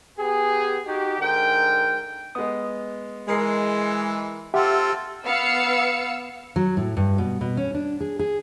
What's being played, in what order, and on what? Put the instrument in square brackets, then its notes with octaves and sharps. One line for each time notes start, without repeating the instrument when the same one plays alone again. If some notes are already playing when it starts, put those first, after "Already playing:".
[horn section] B3 G4 G#4
D#4 F#4 G4
G#2 D3 A#4 G5
[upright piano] G#3 B3 [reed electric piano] D#6
[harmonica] E3 [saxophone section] G#3 [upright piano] A#4 C7
[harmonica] C4 F4 A4 [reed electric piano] G4 E5 F#5 [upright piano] D6
[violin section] B3 F5 E6 C#7
[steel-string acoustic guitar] F#3
A2
G2
B2
B2
C#4
D4
G#4
G#4